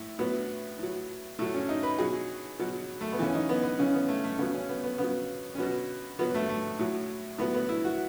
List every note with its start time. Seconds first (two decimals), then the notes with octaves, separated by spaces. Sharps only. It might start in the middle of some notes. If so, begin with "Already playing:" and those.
Already playing: A2 E4
0.19 A2 F#3 B3
0.79 A2 F#3
1.39 A2 F#3 A3
1.54 C#4
1.69 D#4
1.83 B4
1.99 B2 F#3 G#4
2.59 B2 F#3
3.01 A3
3.12 B3
3.19 C#3 E3 C#4
3.34 D#4
3.49 B3
3.63 B3
3.79 C#3 E3 C#4
3.94 B3
4.08 A3
4.24 A3
4.39 C#3 F#3 B3
4.54 C#4
4.69 B3
4.84 B3
4.98 C#3 B3
5.03 F#3
5.55 C#4
5.58 B2 F#3 B3
6.19 B2 F#3 B3
6.34 A3
6.49 A3
6.79 A2 F#3
7.38 A2 F#3 B3
7.54 B3
7.69 E4
7.85 F#4